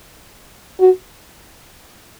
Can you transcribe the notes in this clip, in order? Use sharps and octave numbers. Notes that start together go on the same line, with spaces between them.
F#4